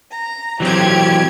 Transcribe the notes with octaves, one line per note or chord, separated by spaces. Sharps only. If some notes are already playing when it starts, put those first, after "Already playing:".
A#5
E3 F#3 C4 G4 G#6